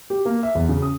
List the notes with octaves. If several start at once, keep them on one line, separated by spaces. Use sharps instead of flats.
G4
A#3
E5
E2
C#3
D#6